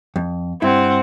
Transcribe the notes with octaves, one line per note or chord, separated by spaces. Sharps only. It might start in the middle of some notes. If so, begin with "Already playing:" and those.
F2
G2 C4 E4 F#5